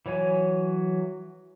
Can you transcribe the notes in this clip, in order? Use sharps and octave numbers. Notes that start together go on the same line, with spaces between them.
E3 F#3 C#5 G#5